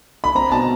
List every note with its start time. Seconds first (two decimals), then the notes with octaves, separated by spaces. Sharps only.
0.24 B5
0.35 C4 A#5
0.52 B2 A5